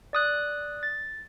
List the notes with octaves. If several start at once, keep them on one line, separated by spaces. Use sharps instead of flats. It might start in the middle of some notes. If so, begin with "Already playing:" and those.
D5 D#6 F#6
A6